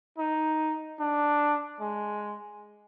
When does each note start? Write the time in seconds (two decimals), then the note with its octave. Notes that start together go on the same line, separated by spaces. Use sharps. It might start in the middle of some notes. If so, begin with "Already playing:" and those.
0.18 D#4
0.99 D4
1.80 G#3